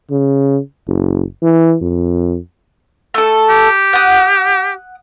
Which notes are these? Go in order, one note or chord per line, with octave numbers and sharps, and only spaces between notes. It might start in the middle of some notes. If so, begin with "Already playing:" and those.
C#3
F#1
E3
F2
A3 A4
G4
F#5 D#6